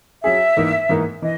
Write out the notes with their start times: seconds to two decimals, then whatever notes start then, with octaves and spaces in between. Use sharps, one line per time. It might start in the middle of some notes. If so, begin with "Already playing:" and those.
0.23 F#3 C#4 G#4 E5
0.57 G#2 E3 A#3 D#4 A#4
0.89 G#2 E3 A#3 D#4 A#4
1.22 E3 D#5